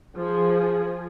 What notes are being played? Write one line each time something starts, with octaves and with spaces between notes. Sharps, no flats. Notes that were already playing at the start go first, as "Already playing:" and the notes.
F3 G#4